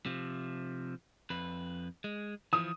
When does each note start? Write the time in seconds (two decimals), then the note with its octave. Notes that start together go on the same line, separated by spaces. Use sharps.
0.06 C3 F3
1.30 F2 B4
2.04 G#3
2.53 E3 F3 D#6